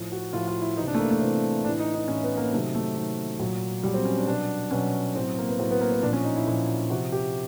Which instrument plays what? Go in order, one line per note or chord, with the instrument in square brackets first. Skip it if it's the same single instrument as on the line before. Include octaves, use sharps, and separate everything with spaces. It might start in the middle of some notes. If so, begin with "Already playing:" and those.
Already playing: [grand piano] A2 F3
F#4
A2 F3 F4
F4
E4
C3 E3 D#4
D4
A3
A#3
A3
C3 E3 C4
A2 E3 D4
D#4
D#4
A2 E3 C#4
B3
A#3
C3 D#3 F#3 A3
A3
C3 D#3 F#3
A#2 F#3
A#2 F#3 G3
C4
C#4
D4
B2 F#3 D4
B2 F#3 C#4
A2 F#3 C4
A#3
B3
A2 F#3 C4
B3
A#3
C4
A#2 F3 D4
C#4
D#4
E4
A#2 F3
C3 F3 F#4
G4